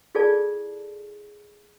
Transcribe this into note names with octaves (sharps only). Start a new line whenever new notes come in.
E4 F4 G#4 A4 D5 A5